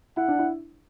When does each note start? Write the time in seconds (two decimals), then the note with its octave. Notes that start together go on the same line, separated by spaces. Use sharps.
0.17 E4 F#5
0.28 D4
0.39 E4